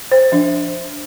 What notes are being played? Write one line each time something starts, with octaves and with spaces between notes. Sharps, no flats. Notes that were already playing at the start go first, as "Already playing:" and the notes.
C5
F3 D4